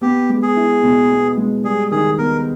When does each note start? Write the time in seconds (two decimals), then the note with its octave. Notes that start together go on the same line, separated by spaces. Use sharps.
0.01 B3 G4
0.29 G#3
0.42 G#4
0.56 E4
0.83 B2
1.10 B3
1.37 G#3
1.64 G3 G#4
1.91 D#3 G#4
2.18 B3 A#4